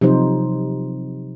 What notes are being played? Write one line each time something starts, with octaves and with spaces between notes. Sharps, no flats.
C3 F3 F#3 D#4 C5